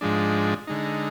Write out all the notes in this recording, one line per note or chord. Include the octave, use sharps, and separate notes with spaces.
G#2 F3 G#3 D4
D3 G#3 D#4